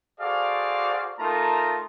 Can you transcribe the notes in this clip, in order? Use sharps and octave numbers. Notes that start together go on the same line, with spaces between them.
F#4 G#4 A4 C5 D5 F5
A3 D#4 F4 A#4 A5 A#5